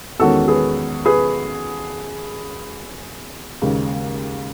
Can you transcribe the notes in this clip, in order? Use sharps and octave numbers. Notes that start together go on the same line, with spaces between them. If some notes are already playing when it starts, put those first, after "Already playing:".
E2 D#3 G#3 C#4 F#4 A4
G#4 B4
G#4 B4
D#2 C#3 G#3